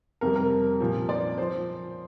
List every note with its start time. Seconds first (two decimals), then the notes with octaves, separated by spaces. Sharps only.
0.21 F2 C3 G3 A#4
0.36 A#4
0.80 A#2 F3
1.09 D5
1.38 F3 C5